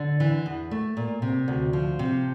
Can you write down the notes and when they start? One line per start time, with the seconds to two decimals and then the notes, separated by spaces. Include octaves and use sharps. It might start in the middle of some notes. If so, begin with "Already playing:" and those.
Already playing: D3
0.20 E3
0.46 E2
0.71 A3
0.97 A#2
1.22 C3
1.48 D2
1.73 F3
1.99 C3